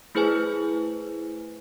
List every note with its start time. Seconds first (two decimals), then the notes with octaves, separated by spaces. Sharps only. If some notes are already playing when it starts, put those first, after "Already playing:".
0.15 A3 E4 G#4 B4 C5 G#5